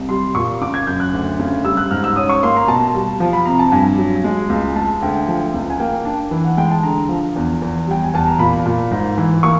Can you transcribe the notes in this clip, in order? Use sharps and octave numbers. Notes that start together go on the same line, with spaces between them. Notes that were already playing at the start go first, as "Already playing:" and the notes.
Already playing: C2
G3 C6
A#2 C#6
C#3 D6
G#6
F#2 G6
F#6
D2
C#3
G3 E6
F#6
G#2 F6
E6
C#4 D#6
C#6
A#3 C6
A#5
B2 A5
G3
F3
B5
C3 A#5
A5
G2 G#5
F#3
G#3
C#2
G#3 A5
D2 G5
F3
C#2
G#5
A#3 G5
D4
E3
F#5
G#3 G5
A5
D3 A#5
F3
E2
E2
G3 G5
G#5
E2 A5
A#5
A#2 B5
A#2
G#2
E3
A#3 C#6